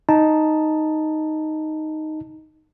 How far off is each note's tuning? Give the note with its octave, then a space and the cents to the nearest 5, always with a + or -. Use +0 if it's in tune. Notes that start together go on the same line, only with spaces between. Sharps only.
D#4 +0 A5 +0